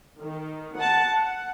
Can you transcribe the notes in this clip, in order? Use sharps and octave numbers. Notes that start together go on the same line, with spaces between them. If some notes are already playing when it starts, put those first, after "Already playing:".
D#3
F#5 A5
F#5